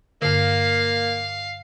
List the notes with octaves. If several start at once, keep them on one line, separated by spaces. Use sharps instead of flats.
G2 D3 A#3 F5